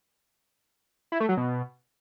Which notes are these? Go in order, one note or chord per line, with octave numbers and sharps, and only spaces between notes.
E4
A3
F#3
B2